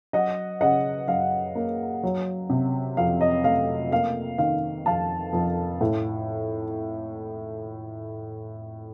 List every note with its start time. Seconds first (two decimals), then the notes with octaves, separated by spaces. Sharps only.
0.13 F#3 D#5 F#5
0.61 C#3 D#5 F#5
1.08 F#2 F5
1.55 A#3
2.03 F#3
2.50 C3
2.97 F2 F5
3.21 D#5
3.44 A3 F5
3.92 A#3 F5
4.38 D#3 F5
4.86 F2 F5 A5
5.33 F2
5.81 A2